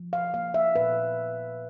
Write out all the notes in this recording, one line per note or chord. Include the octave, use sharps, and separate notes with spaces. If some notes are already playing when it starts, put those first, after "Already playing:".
Already playing: F3
F5
A#3 F5
E5
A#2 B4